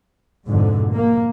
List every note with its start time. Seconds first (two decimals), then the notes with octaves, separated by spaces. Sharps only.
0.48 F2 G#2 B2 D3
0.92 A#3